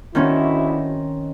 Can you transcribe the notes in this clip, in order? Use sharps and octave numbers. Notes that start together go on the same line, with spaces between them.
D2 D#3 C4 C#4 E4 F#4